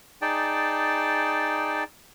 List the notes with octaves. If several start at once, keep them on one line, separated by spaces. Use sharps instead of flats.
D#4 G#4 D5 G5 A5